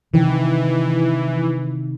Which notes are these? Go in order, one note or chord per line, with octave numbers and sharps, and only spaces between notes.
C3 D#3 E3